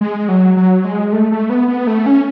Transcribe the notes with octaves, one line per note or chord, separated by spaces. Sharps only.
G#3
F#3
F#3
G#3
A3
A3
B3
B3
A3
C#4